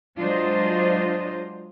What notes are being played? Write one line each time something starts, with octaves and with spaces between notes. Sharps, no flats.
F#3 G#3 D4 F4 C5 D#5